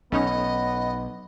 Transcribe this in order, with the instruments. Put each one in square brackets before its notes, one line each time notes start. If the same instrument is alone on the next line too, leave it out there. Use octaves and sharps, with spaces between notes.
[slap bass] B1 [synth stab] A3 C#4 D#4 [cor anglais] B3 [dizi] D#5